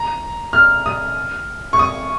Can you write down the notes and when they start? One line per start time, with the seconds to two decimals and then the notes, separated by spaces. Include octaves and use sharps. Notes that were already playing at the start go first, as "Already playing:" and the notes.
Already playing: A#5
0.53 F6
0.86 D#6
1.73 C#6
1.79 D#6